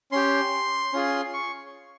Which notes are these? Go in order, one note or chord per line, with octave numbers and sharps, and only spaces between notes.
C#4 G4 C6
C#4 F4 G#4
C#6